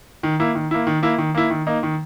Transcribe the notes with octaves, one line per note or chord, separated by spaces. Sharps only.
D#3
A#3 E4
D#3
A#3 E4
D#3
A#3 E4
D#3
A#3 E4
D#3
A#3 D#4
D#3